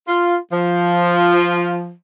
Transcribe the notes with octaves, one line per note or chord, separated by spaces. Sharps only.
F4
F3